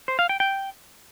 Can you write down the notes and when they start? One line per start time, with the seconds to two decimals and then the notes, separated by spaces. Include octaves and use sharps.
0.08 C5
0.19 F5
0.29 G5
0.40 G5